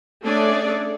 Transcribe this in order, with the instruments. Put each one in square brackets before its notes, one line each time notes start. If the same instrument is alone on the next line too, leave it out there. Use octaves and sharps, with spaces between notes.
[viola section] A3 C#4 D4 G#4 A4 D5